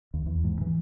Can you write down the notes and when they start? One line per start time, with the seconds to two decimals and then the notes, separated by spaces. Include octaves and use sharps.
0.14 D#2
0.26 E2
0.44 G#2
0.61 E3